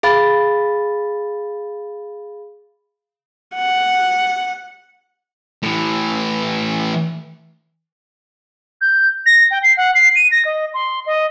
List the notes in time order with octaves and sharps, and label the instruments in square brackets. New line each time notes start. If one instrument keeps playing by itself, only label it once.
[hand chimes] G#4 F5 B5 A6
[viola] F#5
[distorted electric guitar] A2 E3
[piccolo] G6
A#6
G5
C7
F#5
C7
D#7
A#6
D#5
C6
D#5